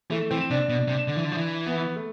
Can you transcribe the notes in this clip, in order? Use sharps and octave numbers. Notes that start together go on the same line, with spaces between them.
E3 A3
E3 C4
C3 D4
B2
C3
D3
E3
D3
F3
E3
B3
A3